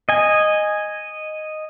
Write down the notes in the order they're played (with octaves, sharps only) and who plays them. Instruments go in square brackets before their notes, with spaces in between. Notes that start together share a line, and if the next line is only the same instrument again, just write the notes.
[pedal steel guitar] D#5 G#5